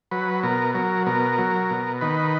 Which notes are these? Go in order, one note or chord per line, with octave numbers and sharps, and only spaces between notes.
F#3 B4
B2 A#4
F#3 A#4
B2 A#4
F#3
B2
D#3 B4